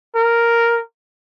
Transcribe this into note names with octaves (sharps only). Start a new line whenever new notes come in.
A#4